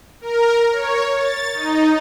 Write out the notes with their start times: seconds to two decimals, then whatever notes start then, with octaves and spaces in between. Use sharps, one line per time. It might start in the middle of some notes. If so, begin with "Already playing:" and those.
0.21 A#4
0.72 C#5
1.16 A6
1.55 D#4